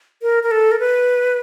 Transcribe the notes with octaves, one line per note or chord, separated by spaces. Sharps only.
A#4
A#4
A4
A#4
B4